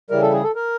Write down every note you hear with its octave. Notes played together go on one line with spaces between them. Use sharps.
C#3 E3 G3 A#4
A4
G#4
A4
A#4